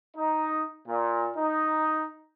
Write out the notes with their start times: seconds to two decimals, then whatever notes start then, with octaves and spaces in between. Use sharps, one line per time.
0.17 D#4
0.86 A#2
1.36 D#4